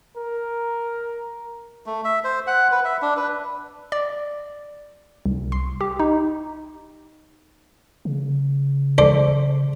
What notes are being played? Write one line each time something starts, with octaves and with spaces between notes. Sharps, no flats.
A#4
A3
E5
C5
F#5
B4
E5
D4
B4
D5
C2
C6
G4
D#4
C#3
A4 C5 D5